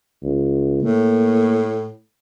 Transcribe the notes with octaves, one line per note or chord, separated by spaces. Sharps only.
C#2
A2 A#3